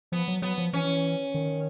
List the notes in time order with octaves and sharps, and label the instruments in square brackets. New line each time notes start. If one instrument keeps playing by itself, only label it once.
[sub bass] F3 [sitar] B3
[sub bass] F#3
[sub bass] F#3 [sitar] B3
[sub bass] F3
[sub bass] E3 [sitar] C#4
[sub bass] D#3